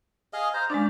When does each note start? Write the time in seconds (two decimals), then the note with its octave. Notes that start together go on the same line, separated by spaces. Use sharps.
0.33 G#4 D#5 F5
0.54 C5 F5 A#5
0.70 G#3 C#4 D4 D5